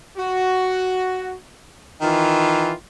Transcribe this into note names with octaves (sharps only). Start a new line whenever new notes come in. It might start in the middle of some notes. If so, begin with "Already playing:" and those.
F#4
D#3 E3 F4